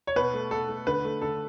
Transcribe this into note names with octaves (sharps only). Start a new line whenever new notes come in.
C#5
B2 B4
A3
B2 A4
A3
D3 B4
A3
D3 A4